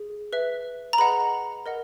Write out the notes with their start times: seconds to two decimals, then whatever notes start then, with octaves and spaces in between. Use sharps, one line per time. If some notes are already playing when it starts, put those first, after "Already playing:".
Already playing: G#4
0.33 B4 E5
0.93 A#5
0.98 G#4 B4 D#5 F#5 B5
1.66 A#4 D#5 F#5